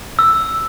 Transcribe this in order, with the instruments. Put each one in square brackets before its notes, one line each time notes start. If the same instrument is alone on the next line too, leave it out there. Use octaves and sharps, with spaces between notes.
[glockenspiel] E6